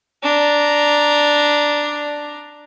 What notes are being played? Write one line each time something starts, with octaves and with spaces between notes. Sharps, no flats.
D4 A#5